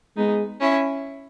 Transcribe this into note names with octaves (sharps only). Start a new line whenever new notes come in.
G#3 B3 D#4
C#4 E4